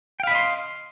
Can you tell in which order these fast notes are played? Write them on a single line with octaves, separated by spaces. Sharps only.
G5 F5 B5 D#5 C6